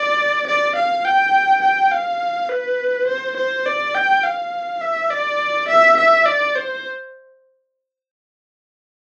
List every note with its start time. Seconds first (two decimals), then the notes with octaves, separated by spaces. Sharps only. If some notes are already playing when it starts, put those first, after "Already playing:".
Already playing: D5
0.47 D5
0.76 F5
1.05 G5
1.62 G5
1.92 F5
2.49 B4
3.08 C5
3.37 C5
3.66 D5
3.95 G5
4.23 F5
4.81 E5
5.10 D5
5.68 E5
5.97 E5
6.26 D5
6.55 C5